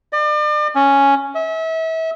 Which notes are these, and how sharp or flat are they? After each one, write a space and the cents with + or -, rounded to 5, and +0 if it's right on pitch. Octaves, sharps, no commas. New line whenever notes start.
D5 +40
C#4 +0
E5 -35